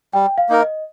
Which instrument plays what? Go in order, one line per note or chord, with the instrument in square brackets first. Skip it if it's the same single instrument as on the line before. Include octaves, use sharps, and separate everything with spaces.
[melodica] G3 [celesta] G5
[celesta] F5
[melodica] A#3 D#4 A#4
[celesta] D#5